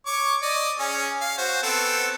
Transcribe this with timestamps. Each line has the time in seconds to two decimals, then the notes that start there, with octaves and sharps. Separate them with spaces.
0.06 C#5 C#6 D6
0.42 D5 D#5
0.79 C#4 G#4
1.21 F5
1.38 F#4 C5
1.63 B3 C4 A4